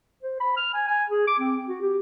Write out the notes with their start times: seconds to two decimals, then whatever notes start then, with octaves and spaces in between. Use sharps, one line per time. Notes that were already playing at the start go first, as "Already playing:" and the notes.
0.23 C5
0.40 B5
0.57 F6
0.74 G#5
0.88 G#5
1.09 G#4
1.27 D6
1.39 C4
1.68 F#4
1.82 G4